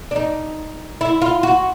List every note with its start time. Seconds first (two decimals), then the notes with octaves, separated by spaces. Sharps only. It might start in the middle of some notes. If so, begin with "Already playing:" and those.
0.11 D4
0.16 D#4
1.01 E4
1.22 F4
1.43 F#4